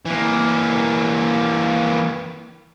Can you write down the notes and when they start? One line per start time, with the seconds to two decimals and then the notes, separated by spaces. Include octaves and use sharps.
0.05 E3 A#3